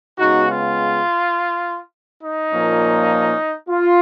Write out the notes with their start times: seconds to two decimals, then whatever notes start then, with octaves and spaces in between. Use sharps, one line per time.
0.18 C#3 G#3 B3 D#4 F#4
0.49 F4
2.22 D#4
2.52 A#2 F3 A#3 C#4
3.68 F4